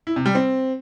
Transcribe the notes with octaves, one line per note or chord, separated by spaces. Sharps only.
E4
C3
G3
C4